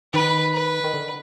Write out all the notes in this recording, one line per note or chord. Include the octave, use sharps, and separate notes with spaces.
D#3 B4
B4
D#3
D3